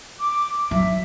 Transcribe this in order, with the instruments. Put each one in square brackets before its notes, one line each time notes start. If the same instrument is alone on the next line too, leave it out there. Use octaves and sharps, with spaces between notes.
[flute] D6
[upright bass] F#3 [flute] E5